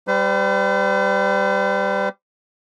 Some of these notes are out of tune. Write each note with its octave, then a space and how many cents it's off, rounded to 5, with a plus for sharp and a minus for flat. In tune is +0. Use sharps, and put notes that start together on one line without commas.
G3 +0 C5 -45